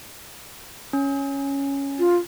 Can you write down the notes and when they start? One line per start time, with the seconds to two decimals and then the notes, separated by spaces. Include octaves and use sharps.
0.93 C#4
1.99 F4